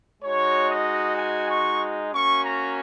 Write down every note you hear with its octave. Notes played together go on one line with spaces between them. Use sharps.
G#3 D#4 F#4 C#5
D#5
G#5
C#6
A#3 C#4 F#4 C#6
A#5